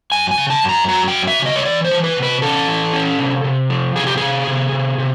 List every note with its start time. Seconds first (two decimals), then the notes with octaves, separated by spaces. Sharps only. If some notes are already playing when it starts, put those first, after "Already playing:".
0.12 F#2 G#5
0.31 G#5
0.38 C#3
0.50 A5
0.63 F#2
0.69 A#5
0.88 F#3 A#5
1.08 G5
1.14 F#2
1.27 E5
1.39 C#3
1.46 D#5
1.56 C#5
1.65 E3 D5
1.84 C5
1.91 E3
2.04 B4
2.17 C3
2.23 B4
2.42 C#4 A4
2.68 E3
2.93 C#4
3.18 C3
3.44 C3
3.70 F3
3.96 C3 G#4
4.07 G4
4.17 C3 G#4
4.47 C3
4.72 C3
4.98 C3